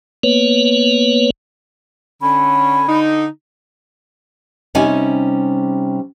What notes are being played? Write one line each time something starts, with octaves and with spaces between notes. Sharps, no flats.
A#3 B3 B4 C#5
D3 C#4 B5
D3 D#4
C3 G3 C#4 D#4 G#5